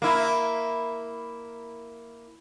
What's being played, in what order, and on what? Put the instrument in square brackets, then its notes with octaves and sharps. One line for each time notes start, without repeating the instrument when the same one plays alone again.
[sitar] A#3 E4